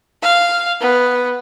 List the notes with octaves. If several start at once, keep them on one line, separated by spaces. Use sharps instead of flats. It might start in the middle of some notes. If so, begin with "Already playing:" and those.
F5
B3